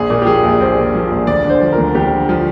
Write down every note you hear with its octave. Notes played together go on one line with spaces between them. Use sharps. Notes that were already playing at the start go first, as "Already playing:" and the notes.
Already playing: A#1 G#4
A#2
G4
F3 G#4
A#1
A#1 C5
A#2
F3
A#1
D2 D5
D3 C5
F3
A#4
D2
D2 G4
D3
F3